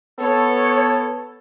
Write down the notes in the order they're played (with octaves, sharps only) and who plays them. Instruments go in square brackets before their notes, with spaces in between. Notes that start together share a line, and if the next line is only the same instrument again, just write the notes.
[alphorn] B3 [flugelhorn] A4 [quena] C#5